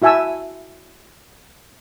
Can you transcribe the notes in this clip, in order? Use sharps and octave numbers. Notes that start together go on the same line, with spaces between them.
E4 F#4 E5 G#5 A5 E6